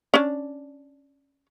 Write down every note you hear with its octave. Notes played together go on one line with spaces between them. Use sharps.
C#4 D4